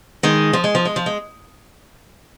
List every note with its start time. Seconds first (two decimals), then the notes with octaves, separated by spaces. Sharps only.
0.23 D#3 G#3
0.53 F3
0.64 G#3
0.75 F3
0.85 G#3
0.96 F3
1.06 G#3